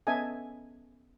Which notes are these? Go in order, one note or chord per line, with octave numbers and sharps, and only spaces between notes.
B3 C#4 A4 D#5 E5 G#5